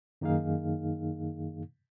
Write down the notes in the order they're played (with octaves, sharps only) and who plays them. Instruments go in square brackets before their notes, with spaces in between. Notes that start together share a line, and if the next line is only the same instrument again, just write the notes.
[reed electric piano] F#2 D#3 A#3 D#4 G#4 F5